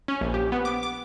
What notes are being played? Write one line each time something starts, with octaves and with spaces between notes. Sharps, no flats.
C#4
A#1
G4
B3
D6
D6